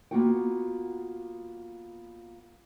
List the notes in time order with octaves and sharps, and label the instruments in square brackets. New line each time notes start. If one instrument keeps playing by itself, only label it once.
[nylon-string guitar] A#3 B3 F4 F#4 F#5 G5